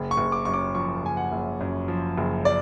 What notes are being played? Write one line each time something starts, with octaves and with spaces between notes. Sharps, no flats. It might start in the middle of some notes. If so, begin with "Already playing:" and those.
Already playing: F#1
C#6
F#1
D6
F#2 C#6
D6
F3 C#6
F#1 G#5
F#5
F#1
F#2
F3
F#1
D5